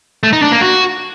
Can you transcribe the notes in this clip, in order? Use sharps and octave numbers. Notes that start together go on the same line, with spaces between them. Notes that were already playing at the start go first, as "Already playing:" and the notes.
A3
D#4
D4
A#3
F#4